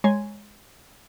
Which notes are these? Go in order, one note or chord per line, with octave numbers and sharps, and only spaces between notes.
G#3 C#5 G#5 A#5 C6 G#6